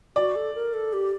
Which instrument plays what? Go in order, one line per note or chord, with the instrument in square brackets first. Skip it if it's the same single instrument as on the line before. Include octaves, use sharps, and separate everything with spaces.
[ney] F#4 [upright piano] D5
[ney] A4
A#4
A4
G4